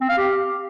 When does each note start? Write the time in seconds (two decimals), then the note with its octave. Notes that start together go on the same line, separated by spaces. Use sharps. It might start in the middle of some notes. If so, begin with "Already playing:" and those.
0.01 C4
0.09 F5
0.17 G4